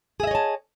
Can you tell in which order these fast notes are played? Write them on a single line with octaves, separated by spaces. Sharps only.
G#4 E5 D#5 C#5 A5